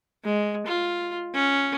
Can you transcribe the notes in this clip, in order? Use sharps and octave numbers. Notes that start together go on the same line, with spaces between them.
G#3
F4
C#4